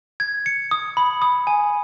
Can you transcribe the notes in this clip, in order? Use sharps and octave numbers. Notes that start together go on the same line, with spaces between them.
G#6
C#7
D#6
B5
D#6
G#5